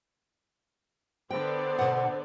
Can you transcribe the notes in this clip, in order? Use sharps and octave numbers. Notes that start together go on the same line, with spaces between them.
D3 B3 C5 D5 G5
B2 F#5